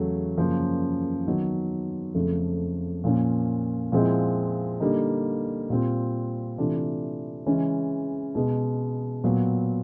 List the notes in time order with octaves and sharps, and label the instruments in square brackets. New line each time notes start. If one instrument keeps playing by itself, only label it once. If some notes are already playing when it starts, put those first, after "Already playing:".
Already playing: [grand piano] E2 C#3 F#3 A3
F#2 C#3 F3 A#3
D#3 F#3 B3
F2 C#3 F3 A3
A#2 F3 A#3 C#4
A#2 F3 G#3 C4 E4
D3 G3 A#3 D#4
A#2 G3 C4 F4
C3 E3 A3 D4 F4
C#3 E3 G#3 C#4
B2 G#3 B3
A#2 F#3 B3